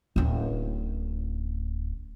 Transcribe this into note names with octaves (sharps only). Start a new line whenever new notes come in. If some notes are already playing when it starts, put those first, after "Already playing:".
D1 C#4